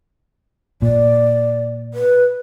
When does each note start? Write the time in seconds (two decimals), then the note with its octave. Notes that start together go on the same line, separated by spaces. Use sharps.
0.82 A#2 D5
1.94 B4